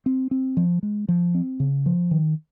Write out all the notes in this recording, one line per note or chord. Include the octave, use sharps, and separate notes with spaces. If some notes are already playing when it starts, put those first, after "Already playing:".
C4
C4
F3
G#3
F3
C4
C#3
F3
D#3